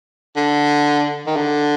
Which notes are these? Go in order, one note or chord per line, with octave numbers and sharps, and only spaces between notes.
D3
D#3
D3